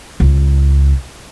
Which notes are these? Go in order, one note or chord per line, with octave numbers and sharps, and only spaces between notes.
C#2